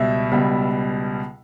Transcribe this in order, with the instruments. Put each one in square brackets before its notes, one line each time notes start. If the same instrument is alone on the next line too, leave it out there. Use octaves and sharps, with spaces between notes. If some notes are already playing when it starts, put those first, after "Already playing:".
Already playing: [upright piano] C#2 B2 G3 E5
C#2 B2 G3